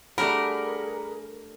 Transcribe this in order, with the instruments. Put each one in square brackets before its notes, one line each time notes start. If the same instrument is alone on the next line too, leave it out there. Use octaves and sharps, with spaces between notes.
[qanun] G3 A3 D4 [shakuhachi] G#4 [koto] A#4 [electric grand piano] F#5 A#5 B5